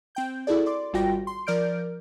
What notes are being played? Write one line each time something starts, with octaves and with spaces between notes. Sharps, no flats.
C4 G5 G6
E4 F#4 G#4 A4 D5
D5 C6 D6
G#1 G3 F4 F#4 G5 A#6
C6
F3 A#4 D5 F6 G6 D7